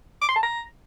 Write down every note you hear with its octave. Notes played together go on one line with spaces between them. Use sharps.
D6
C6
A5
A#5